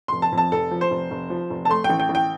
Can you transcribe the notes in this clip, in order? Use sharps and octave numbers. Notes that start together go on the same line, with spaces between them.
F1 C6
A5
F2
A5
F1 A4
F3
C5
F1
F1
F3
F1
A5
A3 C6
G5
A1
G5
A1
G5